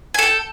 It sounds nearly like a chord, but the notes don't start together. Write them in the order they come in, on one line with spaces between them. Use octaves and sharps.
G#5 A4 G5